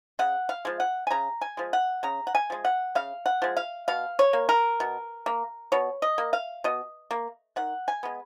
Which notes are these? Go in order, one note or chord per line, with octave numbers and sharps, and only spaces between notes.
C#3 F#5
F5
F3 G#3
F#5
G#5
C#3 A#5
G#5
F3 G#3
F#5
C#3 A#5
F#5
G#5
F3 G#3
F#5
C#3 F5
F#5
F3 G#3
F5
B2 F5
C#5
A#3
A#4
B2
A#3
B2 C#5
D#5
A#3
F5
B2 D#5
A#3
D#3 F#5
G#5
G#3 B3